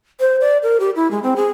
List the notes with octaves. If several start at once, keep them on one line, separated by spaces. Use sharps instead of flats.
C5
D5
A#4
G4
E4
G#3
C4
G#4